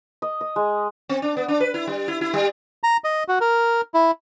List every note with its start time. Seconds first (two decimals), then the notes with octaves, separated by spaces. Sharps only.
0.22 D#5
0.41 D#5
0.56 G#3
1.09 C4
1.22 D4
1.37 B3
1.48 D4
1.60 B4
1.74 E4
1.87 G3
2.08 E4
2.21 E4
2.34 G3
2.84 A#5
3.04 D#5
3.28 F#4
3.41 A#4
3.94 E4